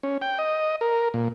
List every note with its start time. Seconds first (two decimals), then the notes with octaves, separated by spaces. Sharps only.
0.03 C#4
0.22 G5
0.39 D#5
0.81 A#4
1.14 A#2